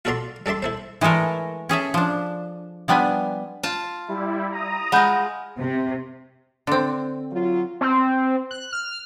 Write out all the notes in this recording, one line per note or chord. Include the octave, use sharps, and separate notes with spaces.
F4 F#4 A4 D5 A#5 C6
G3 A4 D5 E5 C6
E4 A4 C5
E3 G#3 A3 A4 A#4
C#4 G#4 A4 E5
F3 D4
F3 G3 B3 D4 G#5
F4 A5
G3 E4
A#5 D#6
G#3 F4 F#5 B5 G6
C3
D3 C4
F#3 F4
C4
F#6
F6